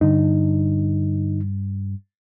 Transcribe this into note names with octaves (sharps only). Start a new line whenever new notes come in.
G2 D3 D#4